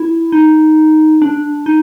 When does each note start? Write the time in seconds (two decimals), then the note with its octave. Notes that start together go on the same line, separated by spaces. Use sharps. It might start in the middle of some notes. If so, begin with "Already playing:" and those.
Already playing: E4
0.32 D#4
1.22 D4
1.66 D#4